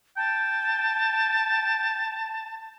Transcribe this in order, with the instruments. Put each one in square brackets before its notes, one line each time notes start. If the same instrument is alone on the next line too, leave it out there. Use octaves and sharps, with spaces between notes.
[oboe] G5 [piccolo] A5